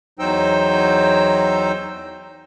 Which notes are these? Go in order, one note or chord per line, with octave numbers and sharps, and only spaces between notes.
E2 F#3 D#4 C5 G5 E6